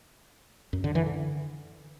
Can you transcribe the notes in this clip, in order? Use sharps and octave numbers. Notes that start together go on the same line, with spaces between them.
F#2
D3
E3
D3